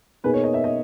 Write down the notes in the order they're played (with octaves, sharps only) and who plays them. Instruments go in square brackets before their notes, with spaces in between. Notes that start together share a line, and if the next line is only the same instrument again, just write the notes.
[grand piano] B2 A#3 D#4 G#4 [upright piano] B4
[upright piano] C#5
D#5
E5
D#5